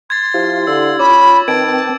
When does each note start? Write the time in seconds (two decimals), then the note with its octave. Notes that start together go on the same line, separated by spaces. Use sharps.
0.10 C6 G#6 A6
0.34 F3 E4 G4 F5
0.67 D3 E6
0.99 C#4 F4 B5 D6
1.48 D#3 C4 B4 G5 A5 G#6 D7